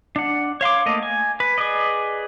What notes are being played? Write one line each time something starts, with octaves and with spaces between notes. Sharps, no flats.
D4 F#5
C#5 F5 C6 D6
A3 A#3 D#5
G#5
B4
G#4 B4 D5 D#5